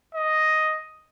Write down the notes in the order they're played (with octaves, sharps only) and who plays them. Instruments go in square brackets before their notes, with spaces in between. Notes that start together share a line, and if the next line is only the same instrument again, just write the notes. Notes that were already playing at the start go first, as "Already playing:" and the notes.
[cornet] D#5